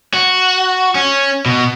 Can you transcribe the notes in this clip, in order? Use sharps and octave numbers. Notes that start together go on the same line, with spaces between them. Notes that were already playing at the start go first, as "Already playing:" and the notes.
F#4
C#4
B2